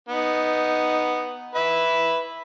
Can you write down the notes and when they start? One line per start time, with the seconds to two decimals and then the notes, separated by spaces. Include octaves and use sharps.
0.09 B3 D#4
1.55 B4 E5